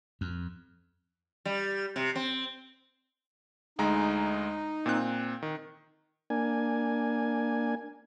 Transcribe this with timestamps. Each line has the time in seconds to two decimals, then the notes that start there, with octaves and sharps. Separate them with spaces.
0.21 F2
1.45 G3
1.96 C3
2.16 C4
3.79 D2 G#3 D#4 A#5
4.86 A#2 C4 F#6
5.42 D#3
6.30 A#3 D4 G#5